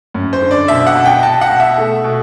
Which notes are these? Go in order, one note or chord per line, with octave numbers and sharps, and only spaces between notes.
F#2
C5
D3
D5
B2 E5
F#5
B2
G5
B2 A5
F#5
B2
E5
A3
B2